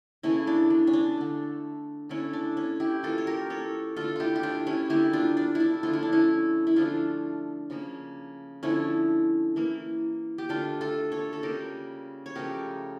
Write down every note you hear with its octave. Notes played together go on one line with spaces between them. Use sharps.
C#3 E3 A3 C#4 E4
D4
D4
C#4
D4
D3 A3
D3 A3 C#4 E4
D4
C#4
E4 G4
E3 A#3 F4 A4
C#5
G4 A#4
A4 C#5
D3 A3 F4 A4
E4 F4 G4
G4
D4 F4
C#4 E4
D3 G3 A#3 E4 G4
D4 F4
D4
E4
D4
D3 F3 A3 F4
E4
D4
C#4 E4
E4
D3 F3 A3 D4 F4
C#3 F3 A#3
D3 F3 A3 C#4 E4
E3 A#3
G4
D3 A3 D4 F4
F4 A4
A4 C#5
A4
C#3 G3 A#3 G4 A#4
C#5
C#3 F3 A3 G4 A#4